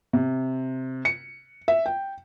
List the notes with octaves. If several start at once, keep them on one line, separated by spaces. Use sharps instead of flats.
C3
C#7
E5
G5